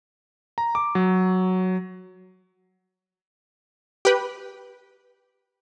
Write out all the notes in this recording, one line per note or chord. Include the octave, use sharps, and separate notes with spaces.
A#5
D6
F#3
G4 B4